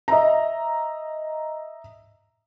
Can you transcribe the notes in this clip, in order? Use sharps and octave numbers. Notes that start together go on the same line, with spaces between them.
D#5 E5 A#5